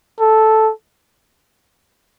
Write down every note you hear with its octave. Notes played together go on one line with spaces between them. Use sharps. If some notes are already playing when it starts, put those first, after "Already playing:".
A4